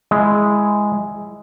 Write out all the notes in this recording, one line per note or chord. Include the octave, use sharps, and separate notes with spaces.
G#3 E4